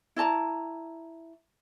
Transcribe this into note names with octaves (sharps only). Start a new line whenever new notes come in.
E4 D5 A5 A#5